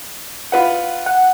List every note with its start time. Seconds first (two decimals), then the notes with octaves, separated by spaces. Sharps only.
0.52 F4 B4 F#5
1.06 F#5